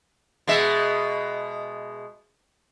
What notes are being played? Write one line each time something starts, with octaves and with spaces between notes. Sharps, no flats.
B2 G#3 E5